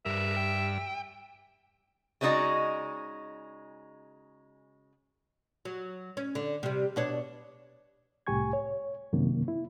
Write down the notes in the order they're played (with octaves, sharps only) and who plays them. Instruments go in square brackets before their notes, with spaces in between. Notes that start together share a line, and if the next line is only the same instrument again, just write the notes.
[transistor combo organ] G2 [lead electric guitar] A#4 B4 [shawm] E5
[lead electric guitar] G5
[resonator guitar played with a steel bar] C#3 G#3 C4 D#4 F#4 D5
[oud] F#3
C#4
D3
C3 G3
B2 D4 C#5
[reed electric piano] C2 A2 G4 G#5 C#6 G#6
C#5
F#2 C3 D#3 A#3
E4